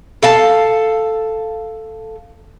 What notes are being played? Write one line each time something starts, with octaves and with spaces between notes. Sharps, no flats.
A4 F5 A5